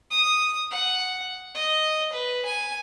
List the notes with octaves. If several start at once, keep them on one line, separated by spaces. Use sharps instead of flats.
D#6
F#5
D#5
B4
G#5